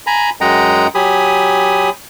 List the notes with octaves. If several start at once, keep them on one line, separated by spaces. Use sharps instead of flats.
G#5 A#5 B5
F#2 G#3 D#5 F#5 G5 A#5
F#3 G4 G#5 B5 D#6